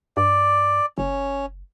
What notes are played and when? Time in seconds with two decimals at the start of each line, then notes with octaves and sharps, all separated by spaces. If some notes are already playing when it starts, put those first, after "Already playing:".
0.17 G2 D5
0.98 F#1 C#4